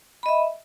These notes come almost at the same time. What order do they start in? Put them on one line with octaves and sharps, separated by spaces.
B5 D#5 E5